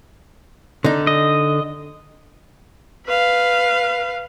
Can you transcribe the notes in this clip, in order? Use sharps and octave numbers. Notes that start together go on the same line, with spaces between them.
D3 D#4
D#5
B4 F5